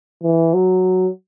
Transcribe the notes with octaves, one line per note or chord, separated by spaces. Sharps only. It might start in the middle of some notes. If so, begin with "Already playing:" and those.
E3
F#3